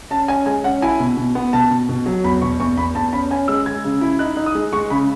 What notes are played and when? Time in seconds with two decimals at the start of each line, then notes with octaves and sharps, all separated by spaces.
0.11 C#4 A5
0.28 C#4 G#5
0.46 G#3 G#5
0.64 C#4 F#5
0.82 E4 G#5
1.00 B2
1.17 B2
1.35 B3
1.53 B2 A5
1.71 B2
1.89 B2
2.06 F#3
2.24 E2 B5
2.42 B2 C#6
2.60 E2 C#6
2.77 E2 B5
2.95 E2 A5
3.13 C#4 B5
3.31 C#4 G#5
3.48 G#3 E6
3.66 G#3 G#6
3.84 C#3
4.01 E4
4.19 D#4 F#6
4.37 D#4
4.46 D#6
4.55 G#3
4.73 G#3 C#6
4.90 C#3 B5